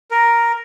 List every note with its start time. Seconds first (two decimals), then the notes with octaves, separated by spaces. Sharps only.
0.11 A#4